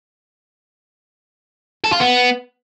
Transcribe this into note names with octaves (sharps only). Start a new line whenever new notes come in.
A4
F4
B3